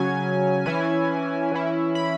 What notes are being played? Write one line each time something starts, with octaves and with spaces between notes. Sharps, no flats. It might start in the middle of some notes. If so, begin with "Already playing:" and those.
Already playing: C#3 F#3 C#4 G#5
E3 C#4 E4 G#5
E3 C#4 E4
B5